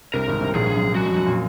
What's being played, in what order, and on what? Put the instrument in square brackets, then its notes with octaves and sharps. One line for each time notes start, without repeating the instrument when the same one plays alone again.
[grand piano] C2 C3 [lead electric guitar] A#4
[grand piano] G#1 G#2
C2 C3
[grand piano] A#1 A#2 [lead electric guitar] G#4
[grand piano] F#2
[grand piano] F#2 [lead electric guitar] F#4
[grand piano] F2
F#2
A#2